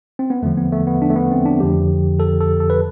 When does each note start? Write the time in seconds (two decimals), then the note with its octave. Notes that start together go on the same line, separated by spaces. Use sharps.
0.19 C4
0.30 B3
0.42 E2 D3 F3 A3
0.58 B3
0.72 A3
0.87 B3
1.02 D4
1.10 A3
1.16 B3
1.31 C4
1.46 D4
1.60 F2 D3 F3 G4
2.20 A4
2.41 A4
2.60 A4
2.70 B4